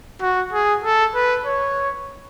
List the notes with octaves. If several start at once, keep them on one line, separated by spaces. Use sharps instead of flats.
F#4
G#4
A4
B4
C#5